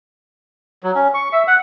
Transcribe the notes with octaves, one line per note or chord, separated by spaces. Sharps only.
F#3
C#4
C#6
E5
F#5